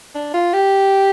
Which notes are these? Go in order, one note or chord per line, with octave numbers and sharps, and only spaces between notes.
D4
F4
G4